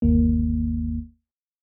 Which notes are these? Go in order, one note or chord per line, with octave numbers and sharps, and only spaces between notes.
G1 D#2 A#3